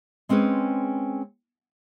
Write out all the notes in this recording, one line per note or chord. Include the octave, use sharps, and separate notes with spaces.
G#3 C4 C#4 G#4 B4